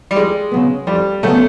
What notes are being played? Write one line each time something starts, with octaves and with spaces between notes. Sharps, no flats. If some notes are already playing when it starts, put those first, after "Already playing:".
G3
F2 G#3
C#3 F#3 B3
F2 G3
C#3 F#3 A3 B3